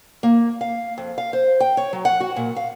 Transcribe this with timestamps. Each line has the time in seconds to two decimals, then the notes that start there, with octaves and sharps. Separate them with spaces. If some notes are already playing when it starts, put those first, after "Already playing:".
0.23 A#3
0.61 F5
0.98 F2
1.18 F5
1.33 C5
1.60 G5
1.77 C#5
1.93 F#3
2.05 F#5
2.20 F#4
2.36 A#2
2.56 F5